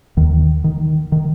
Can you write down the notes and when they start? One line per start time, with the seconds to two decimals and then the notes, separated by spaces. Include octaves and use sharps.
0.17 D#2 D#3
0.64 D#3
1.12 D#3